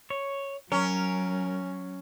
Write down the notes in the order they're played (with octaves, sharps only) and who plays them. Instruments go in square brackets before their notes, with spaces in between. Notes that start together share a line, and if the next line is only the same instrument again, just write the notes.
[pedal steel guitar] C#5
[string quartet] F#3 [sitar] C#4 [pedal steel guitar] A#4